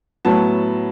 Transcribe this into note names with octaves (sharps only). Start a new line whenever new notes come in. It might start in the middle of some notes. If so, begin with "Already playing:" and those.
A2 F#3 B3 A5